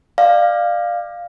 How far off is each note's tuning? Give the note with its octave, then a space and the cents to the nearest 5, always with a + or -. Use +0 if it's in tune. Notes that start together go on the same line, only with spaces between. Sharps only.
D5 +25 F5 +0